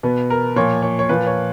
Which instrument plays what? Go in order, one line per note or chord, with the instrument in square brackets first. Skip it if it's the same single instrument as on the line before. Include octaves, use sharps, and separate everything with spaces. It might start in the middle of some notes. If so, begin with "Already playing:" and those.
[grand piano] B2 B3
A#4
A#2 F3 C#5
C#5
C#5
A#2 F3 B4
C#5